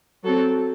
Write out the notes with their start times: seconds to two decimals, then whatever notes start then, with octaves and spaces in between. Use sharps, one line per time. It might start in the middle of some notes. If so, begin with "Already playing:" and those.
0.24 F#3 A4
0.29 C4